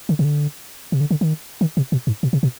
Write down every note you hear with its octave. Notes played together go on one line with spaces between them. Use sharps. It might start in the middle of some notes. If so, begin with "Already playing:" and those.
D3
C3
D3
C3
D3
D3
D#3
D#3
C3
B2
G#2
B2
C3
B2